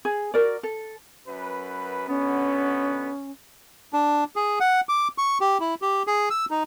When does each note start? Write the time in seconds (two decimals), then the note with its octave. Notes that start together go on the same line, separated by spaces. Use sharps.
0.05 G#4
0.34 F#4 A#4 D5
0.63 A4
1.27 F#2 B4
2.08 B2 D3 B3 C#4
3.93 D4
4.36 G#4
4.60 F#5
4.89 D6
5.18 C#6
5.41 G4
5.60 E4
5.82 G4
6.07 G#4
6.30 E6
6.51 D#4